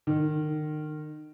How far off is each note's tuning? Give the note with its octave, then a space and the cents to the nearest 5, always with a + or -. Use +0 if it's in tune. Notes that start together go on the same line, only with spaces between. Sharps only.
D#3 -30